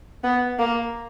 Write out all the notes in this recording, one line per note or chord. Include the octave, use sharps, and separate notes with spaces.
B3
A#3